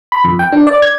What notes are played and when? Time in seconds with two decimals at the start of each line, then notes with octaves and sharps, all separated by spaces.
0.12 B5
0.24 F2
0.39 G5
0.52 D4
0.67 D5
0.82 G#6